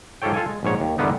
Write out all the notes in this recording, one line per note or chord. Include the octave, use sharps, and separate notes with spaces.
G#2 F4 G4 A4 C#5 G5
F4 A4 F5 G#5
G#3
A#1 G#2 C#5
D#2
E2 G2 D3 A#3 B3 D#4